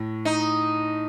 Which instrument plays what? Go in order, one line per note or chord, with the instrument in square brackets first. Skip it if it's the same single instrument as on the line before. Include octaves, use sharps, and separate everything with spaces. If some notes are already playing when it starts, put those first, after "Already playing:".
Already playing: [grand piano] A2
[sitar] D#4